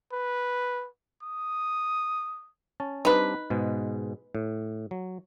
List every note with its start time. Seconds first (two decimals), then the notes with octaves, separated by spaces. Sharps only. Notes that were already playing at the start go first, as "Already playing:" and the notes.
0.13 B4
1.23 D#6
2.80 C#4 A5
3.05 G3 C4 D4 D#4 B4
3.50 G#2 B2 G#3
4.35 A2
4.91 F#3